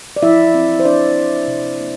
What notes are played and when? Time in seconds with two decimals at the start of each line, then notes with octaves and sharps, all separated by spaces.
0.16 D5
0.22 F3 E4 E5
0.54 C4
0.79 C5
0.85 F3 D4 D5
1.16 C4
1.48 C3
1.80 A#3